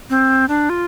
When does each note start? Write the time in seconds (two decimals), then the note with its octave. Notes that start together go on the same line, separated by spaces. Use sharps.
0.10 C4
0.49 D4
0.70 F4